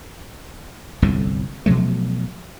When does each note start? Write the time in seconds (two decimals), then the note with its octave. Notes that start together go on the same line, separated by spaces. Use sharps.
1.02 G1 C2 F2 A2
1.66 B2 F3 F#3 A3